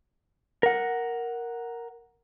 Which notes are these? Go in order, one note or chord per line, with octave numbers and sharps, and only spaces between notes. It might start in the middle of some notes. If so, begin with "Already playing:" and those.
A#4 F#5